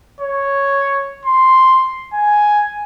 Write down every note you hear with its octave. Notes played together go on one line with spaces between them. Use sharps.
C#5
C6
G#5